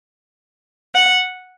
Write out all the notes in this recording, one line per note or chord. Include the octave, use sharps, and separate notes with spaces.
F#5